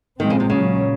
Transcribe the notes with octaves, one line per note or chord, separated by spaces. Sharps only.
A#2 D#3 F3 G#3 C4
C#3
C3
A#2 C#3 F#3 C#4